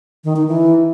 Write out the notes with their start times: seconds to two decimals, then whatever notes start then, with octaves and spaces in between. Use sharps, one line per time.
0.24 D#3
0.36 D#4
0.48 E3